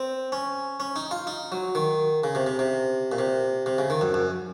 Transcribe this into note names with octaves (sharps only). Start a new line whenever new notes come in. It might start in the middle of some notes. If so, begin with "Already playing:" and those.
Already playing: C4
C#4
C#4
D#4
F4
D#4
F#3
D#3
C#3
C3
C3
C3
A#2
C3
C3
C#3
D#3
F#2
F#2